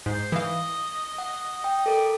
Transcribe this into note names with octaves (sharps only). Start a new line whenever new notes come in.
G#2 C5
E3 D#5 F5
F#5
G5
A4 A#4 D5